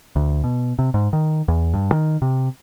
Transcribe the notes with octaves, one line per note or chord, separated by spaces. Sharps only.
D2
B2
C3
G#2
D#3
E2
G2
D#3
C3